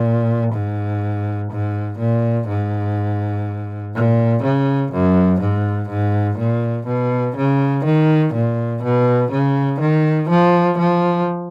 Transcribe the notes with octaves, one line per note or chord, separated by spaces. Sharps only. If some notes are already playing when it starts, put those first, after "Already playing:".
Already playing: A#2
G#2
G#2
A#2
G#2
A#2
C#3
F#2
G#2
G#2
A#2
B2
C#3
D#3
A#2
B2
C#3
D#3
F3
F3